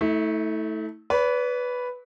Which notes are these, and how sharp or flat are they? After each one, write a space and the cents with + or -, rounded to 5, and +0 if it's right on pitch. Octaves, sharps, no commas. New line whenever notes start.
A3 +0 E4 -40
B4 +0 D5 -45